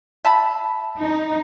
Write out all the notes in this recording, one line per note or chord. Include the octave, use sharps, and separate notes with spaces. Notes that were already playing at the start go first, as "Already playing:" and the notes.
E5 A5 B5
D#4